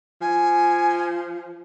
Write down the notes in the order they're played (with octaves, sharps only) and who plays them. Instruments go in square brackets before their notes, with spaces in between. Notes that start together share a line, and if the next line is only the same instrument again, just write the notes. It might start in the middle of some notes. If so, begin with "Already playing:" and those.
[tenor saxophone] F3 [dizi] G#5